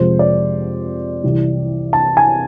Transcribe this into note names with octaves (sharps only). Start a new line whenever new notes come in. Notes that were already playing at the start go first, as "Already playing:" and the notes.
Already playing: F2 C3 F3 G#3 C5
D5
C2 C3 E3
A5
G#5